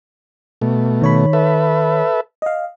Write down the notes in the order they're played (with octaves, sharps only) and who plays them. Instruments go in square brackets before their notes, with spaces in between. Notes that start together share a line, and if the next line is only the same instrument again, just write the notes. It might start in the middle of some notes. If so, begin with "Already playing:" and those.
[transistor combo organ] B2 A3
[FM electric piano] D#3 C#5 B5
[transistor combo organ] A4 B4 E5
[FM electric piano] D#5 F5